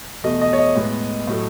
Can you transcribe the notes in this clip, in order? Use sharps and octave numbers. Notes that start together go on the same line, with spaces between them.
E2 B2 A3 D#5
D#5
C#5
D#5
A2 G#3 B3
A2 F#3 A3